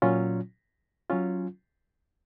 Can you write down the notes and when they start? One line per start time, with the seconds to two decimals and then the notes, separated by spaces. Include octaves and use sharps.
0.02 A#2 F#3 C#4 F4
1.10 F#3 C#4 F4